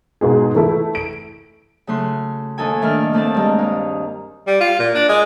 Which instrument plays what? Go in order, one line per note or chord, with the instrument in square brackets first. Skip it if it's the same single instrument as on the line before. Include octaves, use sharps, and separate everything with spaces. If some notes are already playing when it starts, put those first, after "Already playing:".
[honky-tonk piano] G#2 B2 G#3 G#4
E3 A3 E4
D7
[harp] C#3 F#3 A3 C#4 C6 F#6
D#2 D#4 A4 G#5
A2 D#3 A3 A#3 D4 F6
D#2 A3 C4 D#4 A5
G2 G#3 A#5
A#3 D#4
[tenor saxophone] G3
F4
A#2
D4
G#3